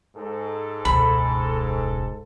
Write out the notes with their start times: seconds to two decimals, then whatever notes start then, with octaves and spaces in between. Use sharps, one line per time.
0.16 G#2 A4
0.85 E1 C#2 B5